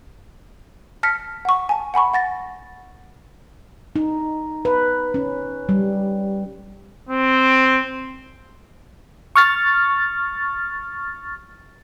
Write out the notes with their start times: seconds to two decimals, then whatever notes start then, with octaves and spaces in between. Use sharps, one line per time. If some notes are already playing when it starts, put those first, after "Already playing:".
1.03 A5 F6 A#6 B6 C#7
1.45 F#5 C#6
1.69 G#5 A5
1.94 F#5 G#5 B5 C#6
2.14 F#5 A6 A#6
3.96 D#4
4.65 B4
5.14 C#4
5.69 G3
7.09 C4
9.36 C#6 F6 A6